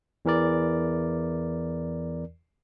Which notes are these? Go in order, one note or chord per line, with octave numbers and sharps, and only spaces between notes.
E2 E3 A#4 D5